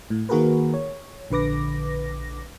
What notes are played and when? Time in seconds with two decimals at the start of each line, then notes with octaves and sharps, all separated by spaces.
0.10 A2
0.29 D#3 A#3 F#4 G#4 A#4 B4
0.74 C#5
1.31 A#1 D3 B4 D6 A#6